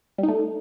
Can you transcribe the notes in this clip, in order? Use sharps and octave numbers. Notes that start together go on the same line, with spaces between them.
G3
D#4
A3